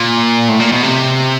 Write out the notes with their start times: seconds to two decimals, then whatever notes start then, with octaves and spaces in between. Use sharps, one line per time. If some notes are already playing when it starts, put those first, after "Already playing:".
Already playing: A#2
0.49 A2
0.60 A#2
0.72 B2
0.83 C3